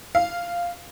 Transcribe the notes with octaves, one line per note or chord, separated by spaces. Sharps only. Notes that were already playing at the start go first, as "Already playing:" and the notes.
F5